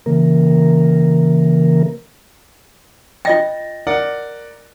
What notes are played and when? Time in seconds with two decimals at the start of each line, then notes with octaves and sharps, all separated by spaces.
0.06 C#3 E3 A#3 A#4
3.25 F4 D#5 G5 A6 A#6
3.87 A#4 D5 F#5